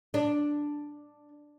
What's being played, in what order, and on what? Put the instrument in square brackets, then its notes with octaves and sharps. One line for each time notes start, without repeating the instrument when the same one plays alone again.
[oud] D4